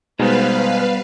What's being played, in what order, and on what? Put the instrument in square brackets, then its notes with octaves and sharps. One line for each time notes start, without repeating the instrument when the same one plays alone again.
[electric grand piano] B2 G#3 D#4 [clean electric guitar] G3 B3 [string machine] B4 F5 [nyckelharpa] C5